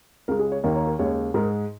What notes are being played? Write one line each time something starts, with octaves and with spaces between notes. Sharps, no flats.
C#2 C#3 G#3 A#4
G#4
C#5
D#2 D#3 A#3 A#4
C#5
A#4
D#2 C#3 G#3 C#5
G#2 G#3 A#4